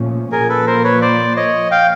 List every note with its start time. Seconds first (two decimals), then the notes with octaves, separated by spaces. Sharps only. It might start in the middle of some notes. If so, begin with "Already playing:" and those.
Already playing: A#2 F3 A3 C#4
0.32 A#2 F3 A#3 G#4 A#4
0.49 A4 B4
0.67 A#4 C5
0.84 B4 C#5
1.02 C5 D5
1.36 C#5 D#5
1.71 F5 G5